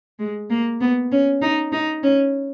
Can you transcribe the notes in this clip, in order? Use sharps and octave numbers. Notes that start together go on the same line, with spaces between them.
G#3
A#3
B3
C#4
D#4
D#4
C#4